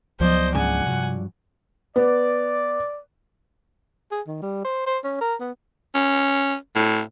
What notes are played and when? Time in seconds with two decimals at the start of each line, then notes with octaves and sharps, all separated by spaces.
0.20 C#2 F3 F#3 B3 C5 D5 D#5
0.55 G#2 C#3 D4 F#5 G#5
0.87 G2 C3 F#3
1.96 B3 D5
4.11 G#4
4.27 D#3
4.42 G3
4.65 C5
4.87 C5
5.04 C#4
5.21 A#4
5.40 B3
5.95 C#4
6.76 A2